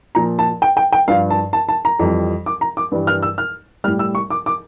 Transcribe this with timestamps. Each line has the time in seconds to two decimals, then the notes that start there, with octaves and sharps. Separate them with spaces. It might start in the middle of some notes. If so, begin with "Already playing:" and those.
0.15 A#2 F3 A#5
0.39 A5
0.62 G5
0.77 G5
0.92 G5
1.08 G2 F3 F5
1.30 A5
1.53 A5
1.69 A5
1.85 A#5
2.00 F2 E3 G3
2.46 D6
2.61 A#5
2.77 D6
2.92 G2 E3 G3
3.07 F6
3.23 E6
3.38 F6
3.84 G3 F6
3.88 A2
3.99 E6
4.15 C#6
4.30 D6
4.46 D6